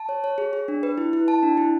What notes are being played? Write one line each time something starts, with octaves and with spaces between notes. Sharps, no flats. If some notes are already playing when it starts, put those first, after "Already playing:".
Already playing: A5
C#5
C#5
G#4
G#4
D4
B4
E4
E4
A5
D4
E4